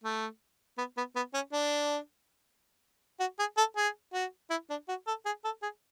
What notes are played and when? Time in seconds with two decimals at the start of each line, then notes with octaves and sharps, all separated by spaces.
0.04 A3
0.78 B3
0.97 B3
1.16 B3
1.34 C#4
1.52 D4
3.20 F#4
3.39 G#4
3.57 A4
3.77 G#4
4.14 F#4
4.50 E4
4.70 D4
4.89 F#4
5.07 A4
5.26 G#4
5.44 A4
5.62 G#4